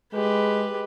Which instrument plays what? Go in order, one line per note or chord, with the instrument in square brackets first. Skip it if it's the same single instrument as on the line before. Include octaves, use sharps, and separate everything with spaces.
[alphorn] G#3 [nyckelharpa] G4 B4